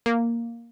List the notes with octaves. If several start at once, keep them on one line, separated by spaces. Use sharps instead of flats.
A#3